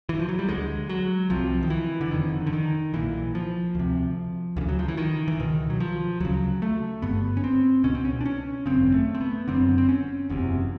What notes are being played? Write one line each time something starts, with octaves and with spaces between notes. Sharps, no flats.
E3
F3
F#3
G3
D2 D3 G#3
F#3
C2 C3 F3
D#3
E3
D3
F1 F2 D3 D#3
D3
D#3
B1 A#2 E3
F3
D2 C3
D2 C#3 D3
F#3
F3
E3
D#3
E3
C#2 B2 D#3
F#3
F3
D2 C#3 F#3
A3
G1 G2 D3 B3
C#4
C4
C#2 B2 C#4
C4
C#4
D4
C#4
G#1 F#2 C#3 C4
A3
C4
B3
F#1 F#2 D3 C4
C4
C#4
F#1 E2 C3